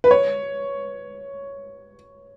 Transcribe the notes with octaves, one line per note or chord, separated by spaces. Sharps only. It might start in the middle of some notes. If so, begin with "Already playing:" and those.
B4
C#5